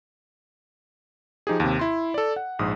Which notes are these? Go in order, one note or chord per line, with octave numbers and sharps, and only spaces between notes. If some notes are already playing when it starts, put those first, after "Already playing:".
F3 D#4 G4 G#4
D#2 C3
E4 C6
A4 D5
F#5
A#1 G#2 D#6